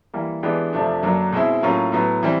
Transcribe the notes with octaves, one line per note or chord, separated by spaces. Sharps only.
E3 G3 A#3
E3 G#3 B3 D4 G4
F2 C3 F3 A3 D4
F#2 D3 F#3 A#3 D4
B2 G#3 C4 E4
A2 F#3 A#3 C#4 F4
A2 F#3 B3
E3 G3 C4